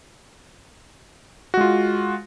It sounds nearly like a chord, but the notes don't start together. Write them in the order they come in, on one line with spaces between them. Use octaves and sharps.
F#4 G#3 F4